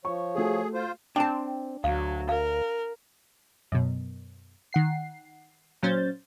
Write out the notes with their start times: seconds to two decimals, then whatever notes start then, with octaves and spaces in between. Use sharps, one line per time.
0.05 F3 C#5 C#6
0.35 A3 F#4 G#4 A4
0.74 F4 C5
1.16 C4 D4 G5 A5
1.84 D2 F#3 F5
2.29 A#4 F5
3.72 F#2 B2
4.73 D#3 F#5 C7
5.83 A#2 F#3 C#4 C5 G6 A6